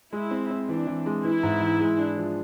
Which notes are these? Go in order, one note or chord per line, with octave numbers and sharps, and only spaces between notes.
G#3 E4
C4
C4
E3 D4
E3
G#3
E3 E4
G#2
E3
G#3
D4
F3